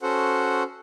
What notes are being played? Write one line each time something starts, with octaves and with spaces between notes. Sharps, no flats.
C#4 F#4 A4 C5 F#5